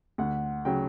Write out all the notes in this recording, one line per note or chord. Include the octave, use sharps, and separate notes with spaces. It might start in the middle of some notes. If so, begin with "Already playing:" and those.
D2 F#5
C#3 F#3 G5